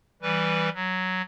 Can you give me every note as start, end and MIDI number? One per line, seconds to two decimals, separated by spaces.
0.22 0.69 52
0.22 0.69 55
0.22 0.69 71
0.74 1.22 54